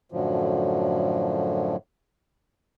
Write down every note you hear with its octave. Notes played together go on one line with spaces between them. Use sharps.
F#2 A2 D3 F3 F#3